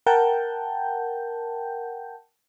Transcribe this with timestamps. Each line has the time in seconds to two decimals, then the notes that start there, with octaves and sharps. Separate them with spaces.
0.06 A#4 F#5 G5 A5 G6